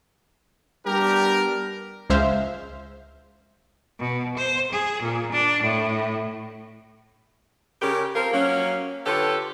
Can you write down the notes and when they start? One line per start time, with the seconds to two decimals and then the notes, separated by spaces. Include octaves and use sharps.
0.86 G3 B3 D4 G4 A#4
2.10 C#2 G#3 C5 E5 F5
3.99 B2
4.37 C5
4.71 G#4
5.02 A#2
5.33 D4
5.64 A2
7.82 C#3 G4 A#4
8.15 F3 C4 F4 A#4
8.33 F#3 A#3 C#4
9.06 D3 F4 G4 A4 B4 C#5